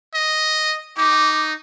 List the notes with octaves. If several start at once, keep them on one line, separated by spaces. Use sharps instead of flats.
D#5
D#4 D6